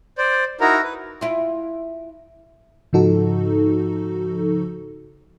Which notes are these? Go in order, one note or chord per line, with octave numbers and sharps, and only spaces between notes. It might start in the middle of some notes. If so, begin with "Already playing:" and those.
C5 D5
D#4 E4 F#4 A#4 A#5
B4
E4 F4
G#2 C#3 F3 D#4 F#4 A4